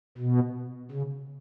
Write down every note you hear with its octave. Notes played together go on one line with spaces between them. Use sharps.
B2
C#3